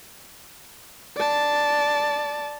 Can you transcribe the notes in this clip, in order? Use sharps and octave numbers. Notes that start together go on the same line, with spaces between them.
D5 A5